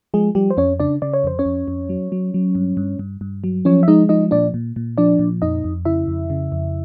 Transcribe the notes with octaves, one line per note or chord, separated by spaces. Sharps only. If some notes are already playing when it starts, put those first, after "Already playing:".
F3 G#3 G#4
F3 G3 G4
C5
F2 C#4 C#5
C#3 D4 D5
C#3 D5
C#5
F2 C5
C#4 C#5
F2
F2
F#3
F#3
F#3
G2
G2
G2
G2
F#3
F3 C#4 C#5
E5
G#3 D#4 D#5
F3 D#4 D#5
A#2 D4 D5
A#2
A#2
F3 D4 D5
A#2
F2 D#4 D#5
F2
C#3 E4 E5
F2
C#3
F2